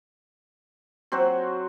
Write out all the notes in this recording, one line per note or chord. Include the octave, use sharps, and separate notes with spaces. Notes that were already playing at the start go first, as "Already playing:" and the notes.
F#3 C4 F#4 C5